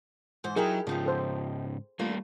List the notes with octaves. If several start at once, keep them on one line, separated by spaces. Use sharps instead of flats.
G#2 E3 C5
F#3 D#4 E4 G4 G#4 A#4
G#2 C#3 F3 D#4 G4
A4 C5
G3 A3 A#3 D4 F4